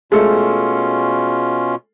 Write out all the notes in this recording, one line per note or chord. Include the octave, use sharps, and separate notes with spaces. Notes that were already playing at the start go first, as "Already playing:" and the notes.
B2 G#3 A3 C#4 F4 A4